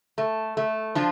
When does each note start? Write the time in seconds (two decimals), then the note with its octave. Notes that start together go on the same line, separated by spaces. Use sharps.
0.18 A3
0.57 A3
0.95 F3 D4 F4